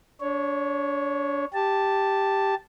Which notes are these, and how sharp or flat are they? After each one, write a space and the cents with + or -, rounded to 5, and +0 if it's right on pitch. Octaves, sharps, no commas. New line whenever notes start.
D4 -30 C#5 +0
G4 +0 A5 +0